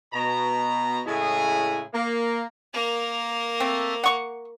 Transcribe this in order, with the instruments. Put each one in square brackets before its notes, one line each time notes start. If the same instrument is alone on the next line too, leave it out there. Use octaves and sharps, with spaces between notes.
[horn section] B2 A#5
A2 C#3 G#3 E4 G#4 G#5
A#3
[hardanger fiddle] A#3 A#4
[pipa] A3 C4
F#5 C#6